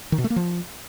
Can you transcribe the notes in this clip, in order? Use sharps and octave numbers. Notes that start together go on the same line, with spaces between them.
D#3
B2
A3
A#3
F3